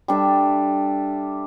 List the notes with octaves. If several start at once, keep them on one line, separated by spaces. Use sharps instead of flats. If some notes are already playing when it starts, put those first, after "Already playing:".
G3 D4 A4 E5